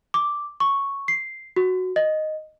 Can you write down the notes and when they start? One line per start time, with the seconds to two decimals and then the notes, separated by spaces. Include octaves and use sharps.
0.14 D6
0.60 C#6
1.08 C7
1.56 F#4
1.96 D#5